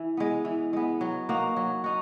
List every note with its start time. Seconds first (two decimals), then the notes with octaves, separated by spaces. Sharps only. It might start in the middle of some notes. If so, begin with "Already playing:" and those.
Already playing: E3
0.17 G#3 B3
0.45 E3
0.73 G#3 B3
1.01 F#3
1.29 A#3 D#4 F#4
1.56 F#3
1.84 D#4 F#4